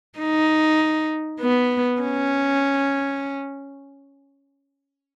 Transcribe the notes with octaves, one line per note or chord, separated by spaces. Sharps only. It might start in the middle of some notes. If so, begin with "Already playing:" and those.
D#4
B3
C#4